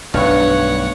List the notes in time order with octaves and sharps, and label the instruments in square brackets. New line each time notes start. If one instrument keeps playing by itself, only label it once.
[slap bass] B1 A3 [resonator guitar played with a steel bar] G2 [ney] B4 [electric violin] C#5 F#5